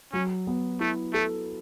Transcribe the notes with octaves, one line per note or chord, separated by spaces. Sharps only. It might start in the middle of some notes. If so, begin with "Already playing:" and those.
F#3 C#4
B3
A3 E4
A3 A4